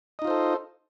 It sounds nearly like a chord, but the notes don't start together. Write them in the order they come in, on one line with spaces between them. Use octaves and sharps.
D#5 D#4 F4 C5 A4